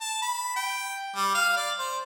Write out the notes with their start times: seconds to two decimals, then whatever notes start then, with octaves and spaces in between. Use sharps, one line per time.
0.01 A5
0.22 B5
0.56 G5
1.16 G3
1.35 F5
1.57 D5
1.79 C5